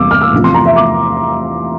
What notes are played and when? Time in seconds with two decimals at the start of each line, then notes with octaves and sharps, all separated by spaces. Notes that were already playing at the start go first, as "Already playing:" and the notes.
Already playing: E2 C3 G3 A#3 D6 E6
0.11 F6
0.22 E6
0.32 E2 C3 F3 A3
0.44 C6
0.54 A#5
0.66 E5
0.76 D6